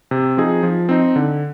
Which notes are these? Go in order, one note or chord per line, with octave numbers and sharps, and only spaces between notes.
C3
F3 C4 D#4 G#4
F3
C4 D#4
D3